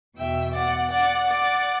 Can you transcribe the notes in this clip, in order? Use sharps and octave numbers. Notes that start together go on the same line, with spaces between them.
E2 B2 E5 G5
D5 F#5
D5 F#5
D5 F#5